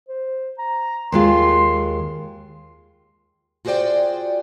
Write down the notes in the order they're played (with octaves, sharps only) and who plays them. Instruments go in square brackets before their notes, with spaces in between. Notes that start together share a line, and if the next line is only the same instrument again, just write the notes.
[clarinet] C5
A#5
[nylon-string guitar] D#2 G#3 F4 [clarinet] C6
[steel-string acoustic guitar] F4 F#4 G#4 C5 D5 G5